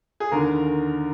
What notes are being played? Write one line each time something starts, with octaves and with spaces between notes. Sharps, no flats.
G#4
D#2 D3 A#4